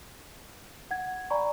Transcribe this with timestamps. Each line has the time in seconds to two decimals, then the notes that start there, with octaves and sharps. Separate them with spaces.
0.91 F#5 G#6
1.30 D5 G#5 A#5 B5 C#6